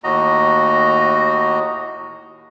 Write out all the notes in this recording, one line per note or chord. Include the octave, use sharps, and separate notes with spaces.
D#2 A2 F#4 D#5 A#5